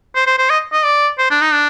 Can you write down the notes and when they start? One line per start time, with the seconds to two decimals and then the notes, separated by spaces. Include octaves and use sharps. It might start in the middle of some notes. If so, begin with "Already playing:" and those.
0.15 C5
0.27 C5
0.38 C5
0.50 D#5
0.72 D#5
0.84 D5
1.18 C5
1.30 D4
1.41 D#4
1.52 D4